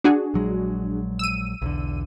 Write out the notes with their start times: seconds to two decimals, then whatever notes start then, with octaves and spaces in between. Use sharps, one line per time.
0.04 D4 F#4 G#4
0.34 A#1 F#3 G#3
1.19 E6 D#7
1.62 B1 E2 D3